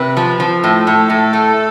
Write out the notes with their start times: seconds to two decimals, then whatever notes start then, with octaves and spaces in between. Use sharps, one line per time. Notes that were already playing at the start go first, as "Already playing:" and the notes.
Already playing: C3 B4
0.17 F3
0.40 F3
0.63 A2 A4
0.87 A2
1.10 A2
1.33 A3